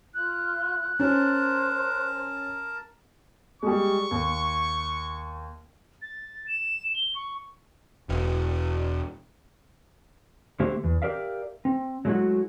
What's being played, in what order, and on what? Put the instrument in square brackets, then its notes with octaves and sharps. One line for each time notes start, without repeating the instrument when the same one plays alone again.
[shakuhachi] F4 [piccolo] F#6
[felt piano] C#4 [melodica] A#4 A5 [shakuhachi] C5
[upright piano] G3 G#3 [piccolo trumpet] C#6
[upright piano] D#2
[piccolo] A6
E7
G7
C#6
[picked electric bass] E1
[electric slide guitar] D3 A3 A#3 G4 C5 E5
E2
G4 A#4 D5 E5 F5
C4
F#3 G#3 A3 C4 E4 F#4